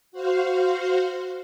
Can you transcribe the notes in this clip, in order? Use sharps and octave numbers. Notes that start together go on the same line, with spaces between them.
F#4 C5 F5